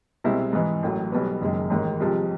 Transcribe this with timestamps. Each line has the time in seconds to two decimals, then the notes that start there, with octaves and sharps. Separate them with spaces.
0.24 C2 B2 G#3 C4 E4
0.53 G#2 E3 G#3
0.83 A1 A2 F#3
1.12 B1 B2 G3 B3
1.41 F#1 F#2 D#3 G#3
1.70 A1 G#2 D#3
2.00 C2 C3 F3 G#3